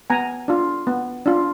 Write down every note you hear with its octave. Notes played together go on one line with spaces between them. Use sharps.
B3 G#5 A#5
D4 F4
B3
D4 F4